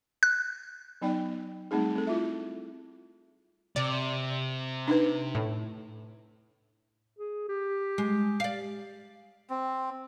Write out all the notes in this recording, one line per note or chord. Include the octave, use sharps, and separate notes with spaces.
F#6
F#3 B3 D#4 D5 G5
G3 A3 C4 D#4 G#4
C4 A4
E4 F4 E5
C3 D5
D4 D#4 B4
A2
G#4
G4
G#3
D5 F5
C4